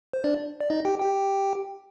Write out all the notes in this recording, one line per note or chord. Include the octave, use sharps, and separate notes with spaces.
C5
D4 D5
D5
D#4 D#5
G4 G5
G4 G5